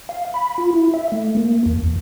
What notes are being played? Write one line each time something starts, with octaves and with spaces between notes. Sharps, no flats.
F5
B5
F4
E4
E5
A3
A#3
E2
E2